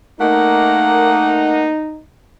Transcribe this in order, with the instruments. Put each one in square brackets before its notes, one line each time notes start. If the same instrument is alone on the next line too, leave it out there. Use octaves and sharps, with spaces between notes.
[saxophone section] A3 A#3 [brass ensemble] D#4 [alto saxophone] F#5